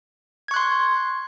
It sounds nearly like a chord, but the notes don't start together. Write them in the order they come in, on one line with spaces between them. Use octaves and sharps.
G#6 C#6 F#6 C6